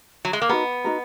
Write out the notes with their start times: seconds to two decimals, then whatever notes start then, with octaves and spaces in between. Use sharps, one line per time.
0.25 F#3
0.33 G#3
0.42 A#3
0.49 B3 D#4 F#4 A#4
0.84 D#4 F#4 A#4